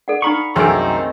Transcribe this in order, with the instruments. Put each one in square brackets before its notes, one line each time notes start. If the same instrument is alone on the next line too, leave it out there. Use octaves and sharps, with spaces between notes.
[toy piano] A4 D5 F#5
[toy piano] D#4 A#5 D#6 [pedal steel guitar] F5 B5 C#6
[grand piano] C2 F#2 [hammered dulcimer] D#3 A3 C4 [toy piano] G#4 G#5 [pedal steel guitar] A#4